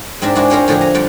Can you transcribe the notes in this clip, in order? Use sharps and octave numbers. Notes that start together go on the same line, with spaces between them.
G#2 C4 D4 A#4 E5
G#3 D4 E4 F#4 G#4
F4 G#4 A#4 C5 C#5 G5
A2 D3 F3 G4 G#4
G#5 A#5
F2 G3 F4 F#5 G5